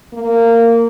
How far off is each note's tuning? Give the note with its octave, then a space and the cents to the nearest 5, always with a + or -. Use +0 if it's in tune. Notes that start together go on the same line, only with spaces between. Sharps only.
A#3 -15